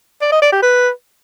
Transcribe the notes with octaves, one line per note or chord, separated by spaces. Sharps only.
D5
D#5
D5
G4
B4